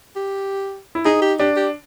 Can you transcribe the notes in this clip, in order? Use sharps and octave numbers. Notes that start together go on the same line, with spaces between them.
G4
E4
D#4 G#4
G4
D4 G4
G4